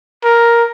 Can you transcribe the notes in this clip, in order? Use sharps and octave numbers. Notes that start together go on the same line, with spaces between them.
A#4